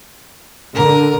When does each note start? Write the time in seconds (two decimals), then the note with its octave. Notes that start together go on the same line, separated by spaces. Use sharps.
0.75 D3 A#4